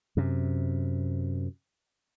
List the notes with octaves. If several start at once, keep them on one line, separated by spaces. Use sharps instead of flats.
F#2 C3